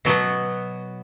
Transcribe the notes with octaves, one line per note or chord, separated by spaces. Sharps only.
B2 F#3 B3